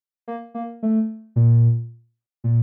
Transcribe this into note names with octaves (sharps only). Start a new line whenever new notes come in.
A#3
A#3
A3
A#2
A#2